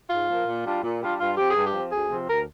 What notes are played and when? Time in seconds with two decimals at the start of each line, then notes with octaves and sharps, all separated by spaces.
0.10 G#2 F4
0.28 F3 A#3
0.46 A#2
0.65 G3 D4 F4
0.82 A#2
1.01 G3 D4 F4
1.18 G2 F4
1.36 F3 C4 G4
1.50 G2 G#4
1.64 G4
1.73 F3 C4
1.91 D2 G#4
2.09 C3 F3 C4
2.27 D2 A#4